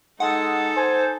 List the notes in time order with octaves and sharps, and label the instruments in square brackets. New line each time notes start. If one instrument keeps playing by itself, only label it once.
[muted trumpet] G#3 [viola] D#4 A4 [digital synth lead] F#5
[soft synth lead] C5 [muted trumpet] G#5